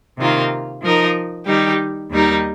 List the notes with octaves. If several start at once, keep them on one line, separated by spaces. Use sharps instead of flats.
C3 D#3 A#3 F4
F3 D#4 A#4 D#5
D#3 G3 D#4 G4
D#2 D#3 G3 D#4 A#4